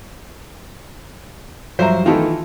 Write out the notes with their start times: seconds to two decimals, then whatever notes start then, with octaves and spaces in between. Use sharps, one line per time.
1.79 G2 F3 F#3 C5 E5 A#5
2.06 D#3 E3 A3 F4 A4